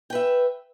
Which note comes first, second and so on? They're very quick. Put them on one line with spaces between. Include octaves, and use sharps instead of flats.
G5 B4 E5